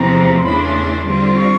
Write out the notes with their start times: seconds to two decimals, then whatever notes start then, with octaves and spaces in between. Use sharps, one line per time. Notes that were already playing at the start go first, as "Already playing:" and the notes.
Already playing: E2 C3 F3 A3 C4 A#5
0.38 C6
0.44 E2 C#3 E3 A3 D4 B5
0.60 C6
0.75 C6
1.05 D3 G3 C4 F4
1.36 C#6